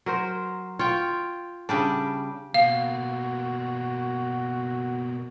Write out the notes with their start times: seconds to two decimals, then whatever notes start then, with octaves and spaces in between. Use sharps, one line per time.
0.06 F#3 A#4 C5
0.79 F4 C#5 G5
1.69 C#3 G3 D4
2.54 B2 A#3 F#4 F5